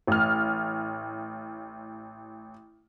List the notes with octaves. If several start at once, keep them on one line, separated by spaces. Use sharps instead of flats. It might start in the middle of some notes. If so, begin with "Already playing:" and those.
A1 F6